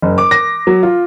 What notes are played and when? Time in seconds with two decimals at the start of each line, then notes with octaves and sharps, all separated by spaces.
0.02 F#1
0.18 D6
0.31 A#6
0.67 F#3
0.83 F4